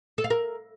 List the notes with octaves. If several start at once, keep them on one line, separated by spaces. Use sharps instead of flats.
A4
F5
A#4